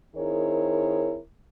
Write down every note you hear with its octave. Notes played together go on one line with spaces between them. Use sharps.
D#3 C4 E4 G#4 A#4 C#5